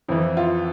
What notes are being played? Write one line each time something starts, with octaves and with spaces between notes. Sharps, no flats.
F2 E3 E4
F4